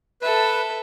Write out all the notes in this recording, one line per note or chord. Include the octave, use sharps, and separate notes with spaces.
A4 B4 E5